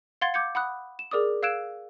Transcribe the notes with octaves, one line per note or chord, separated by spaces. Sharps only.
F5 F#5 C6 G#6 A6
D6 G6 G#6 C#7
F#5 B5 D#6 F#6
E7
G#4 A#4 D5 D6 D#6
F5 E6 F#6 G#6 D7 E7